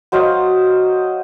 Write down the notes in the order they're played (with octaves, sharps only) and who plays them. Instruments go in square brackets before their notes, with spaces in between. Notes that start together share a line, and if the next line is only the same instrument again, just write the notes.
[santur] F#3 C5 D#5 F5